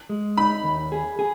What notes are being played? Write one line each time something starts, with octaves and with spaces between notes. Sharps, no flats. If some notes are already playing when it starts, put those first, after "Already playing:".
G#3
D#4 B5
D#2
G#4
G#4